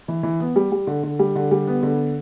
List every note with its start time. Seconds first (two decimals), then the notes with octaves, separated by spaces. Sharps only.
0.08 E3
0.23 E3
0.40 B3
0.56 G3
0.72 G3
0.87 D3
1.03 D3
1.19 G3
1.36 D3
1.51 G3
1.67 B3
1.83 D3